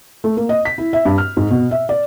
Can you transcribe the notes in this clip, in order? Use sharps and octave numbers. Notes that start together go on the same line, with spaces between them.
A3
A#3
D#5
B6
E4
E5
G2
F6
G#2
B2
E5
D5